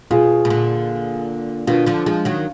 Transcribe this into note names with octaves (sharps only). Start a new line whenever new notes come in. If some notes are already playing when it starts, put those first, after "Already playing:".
B2 F4 G#4
B2
A#2 D3
B2 D#3 D4 F4
D3 F3
F3 G#3
D#3 F#3